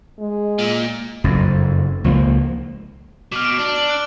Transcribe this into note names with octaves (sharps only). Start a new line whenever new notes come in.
G#3
A#2
F#1 F2
C#2 F3 A3 A#3
B2 D6 F6
F6 D7
D4
F#7
F#6 D7 G7